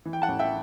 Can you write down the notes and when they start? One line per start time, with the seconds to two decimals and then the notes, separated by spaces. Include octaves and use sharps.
0.05 E3
0.13 G5
0.22 F#5 A5
0.28 A1
0.39 E5 G5